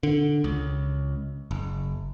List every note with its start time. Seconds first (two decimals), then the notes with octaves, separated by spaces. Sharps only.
0.03 D3
0.44 C#2
1.51 F#1